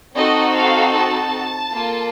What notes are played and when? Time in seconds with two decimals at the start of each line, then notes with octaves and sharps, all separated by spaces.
0.16 C4 D#4 F#4 A4 D#5
0.56 F5
0.94 A5
1.72 A#3 F4 A4